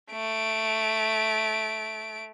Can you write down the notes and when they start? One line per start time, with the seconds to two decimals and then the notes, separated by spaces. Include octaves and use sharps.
0.12 A3 D7